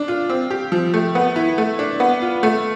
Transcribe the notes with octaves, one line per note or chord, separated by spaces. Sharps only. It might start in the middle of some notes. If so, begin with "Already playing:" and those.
Already playing: D4
F4
C4
G4
F3
A3
B3
E4
A3
D4
B3
F4
A3